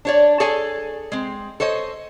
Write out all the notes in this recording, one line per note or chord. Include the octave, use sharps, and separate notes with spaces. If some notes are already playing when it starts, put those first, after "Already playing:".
D4 C#5 D5
G#4 A4 C#5 D5 G#5
G#3 C4
A4 C5 C#5 D#5